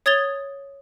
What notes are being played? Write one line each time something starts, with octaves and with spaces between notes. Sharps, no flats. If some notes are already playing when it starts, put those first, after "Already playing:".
C#5 D#6 G#6 A6 F7 G7